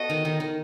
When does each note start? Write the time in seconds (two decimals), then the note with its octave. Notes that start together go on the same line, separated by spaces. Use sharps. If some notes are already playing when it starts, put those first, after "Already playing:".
Already playing: B3 F#4 A4 D#5
0.10 D#3
0.25 D#3
0.40 D#3